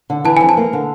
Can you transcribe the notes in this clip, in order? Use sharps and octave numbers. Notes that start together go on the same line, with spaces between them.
D3
E3 A5
F2 G#5
A5
A#3
D3